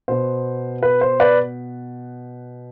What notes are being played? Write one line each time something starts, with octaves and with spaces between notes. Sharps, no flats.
B2 B3 C5
B4
C5
B4 D5